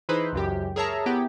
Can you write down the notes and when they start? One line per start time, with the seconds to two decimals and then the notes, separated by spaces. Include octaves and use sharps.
0.09 E3 D#4 E4 G#4 B4 C5
0.33 C#2 F#2 G4
0.76 G#4 A#4 C#5 E5 A5 A#5
1.06 B3 E4 G4 G5